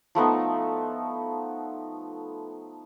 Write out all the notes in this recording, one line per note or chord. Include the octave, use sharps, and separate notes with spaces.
F3 A3 B3 D#4